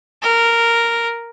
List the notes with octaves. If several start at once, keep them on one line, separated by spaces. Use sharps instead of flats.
A#4